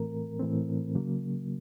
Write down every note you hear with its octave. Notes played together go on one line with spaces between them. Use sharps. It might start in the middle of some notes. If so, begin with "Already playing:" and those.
Already playing: A2 E3 A3 C4 A#4
A2 E3 A3 C4
C#3 F#3 A#3